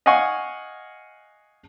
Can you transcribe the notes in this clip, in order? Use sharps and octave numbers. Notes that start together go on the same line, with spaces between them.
D#5 F5 F#5 G#5 C#6